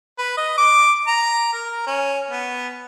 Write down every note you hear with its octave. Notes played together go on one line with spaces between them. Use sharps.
B4
D#5
D6
A#5
A#4
C#4
B3